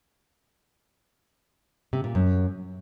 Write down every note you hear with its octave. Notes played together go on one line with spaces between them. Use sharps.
C3
A#2
F#2